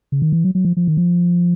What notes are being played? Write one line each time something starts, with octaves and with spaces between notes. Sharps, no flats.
C#3
D#3
E3
F#3
F#3
F3
F3
D#3
F3